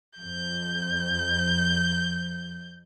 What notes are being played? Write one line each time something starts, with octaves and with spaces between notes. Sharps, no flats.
F2 G6